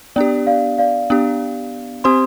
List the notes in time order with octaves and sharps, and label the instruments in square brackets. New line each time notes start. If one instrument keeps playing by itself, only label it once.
[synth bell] B3 D4 G4 [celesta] D5
[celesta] D5 F5
D5 F5
[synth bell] B3 D4 G4
[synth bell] C4 G4 C5 [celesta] C6 D#6